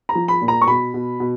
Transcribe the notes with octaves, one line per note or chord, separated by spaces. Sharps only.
A#5
F3
B5
A#2
A#5
C#6
B2 B5
B2
B2